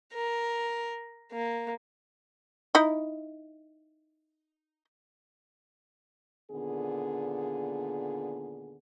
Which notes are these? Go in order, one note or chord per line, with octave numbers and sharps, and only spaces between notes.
A#4
A#3
D#4 E4 D#5
D#2 A#2 D3 B3 G#4